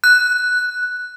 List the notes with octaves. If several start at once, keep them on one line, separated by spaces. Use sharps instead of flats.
F#6